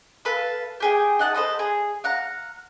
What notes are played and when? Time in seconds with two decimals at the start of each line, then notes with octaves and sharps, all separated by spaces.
0.25 A4 B4 F5 A5
0.80 G4 G#4 G5
1.19 D#4 F#5 A5
1.34 A4 C5 D#5 B5
1.59 G#4
2.04 F5 F#5 A#5